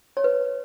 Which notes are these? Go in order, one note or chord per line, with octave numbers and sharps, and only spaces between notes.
C#5
B4